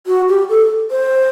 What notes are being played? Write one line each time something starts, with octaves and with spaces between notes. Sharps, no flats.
F#4
G4
A4
C5